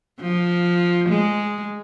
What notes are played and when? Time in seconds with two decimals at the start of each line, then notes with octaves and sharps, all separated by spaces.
0.20 F3
1.09 G#3